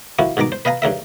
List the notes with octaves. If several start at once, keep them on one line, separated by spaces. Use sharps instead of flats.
F3 A#3 E4 F#4
G#2 B2 D#3 A#5 D6
C5
B4 D#5 F5 G#5 A#5
G2 C#3 A#4 E5